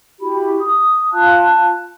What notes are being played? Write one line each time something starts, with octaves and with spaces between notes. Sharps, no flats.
E4 F#4 G4 B5
D#6
F4 F5 A5 F#6